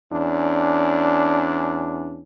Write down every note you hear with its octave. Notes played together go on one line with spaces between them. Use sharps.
E2 C#4 D4